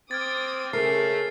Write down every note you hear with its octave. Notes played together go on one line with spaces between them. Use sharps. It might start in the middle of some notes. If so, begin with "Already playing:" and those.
C4 D6 D#6 F6 G#6 A6
C#3 A3 G#4 A#4 C7